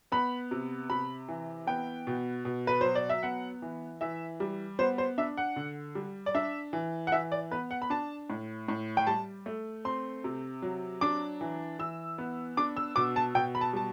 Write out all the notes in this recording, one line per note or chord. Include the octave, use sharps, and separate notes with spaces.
B3 B5
C3
C3 B5
E3
B3 G5
B2
B2
B4
F#3 C5
D5
E5
B3 F#5
E3
E3 E5
G3
B3 C5
C5
D4 E5
F#5
D3
G3
D5
D4 E5
E3
F#5
E3 E5
D5
B3 B4
F#5
B5
D4 A5
A2
A2
G5
G3 A5
A3
C4 C6
C3
F#3
D4 D6
E3
E3 E6
B3
D4 D6
E6
B2 D6
A5
B2 G5
B5
A5
G3 A5